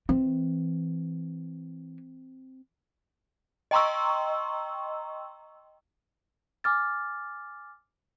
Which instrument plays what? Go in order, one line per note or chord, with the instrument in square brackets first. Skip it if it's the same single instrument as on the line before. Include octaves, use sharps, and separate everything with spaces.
[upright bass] E3 [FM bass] C4
[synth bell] D#5 G5 A#5 C6 C#6 E6
[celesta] G#5 D6 F6 A6